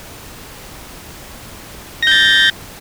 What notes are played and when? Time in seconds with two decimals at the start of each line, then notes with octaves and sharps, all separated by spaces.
2.03 A#6
2.07 G6
2.11 A6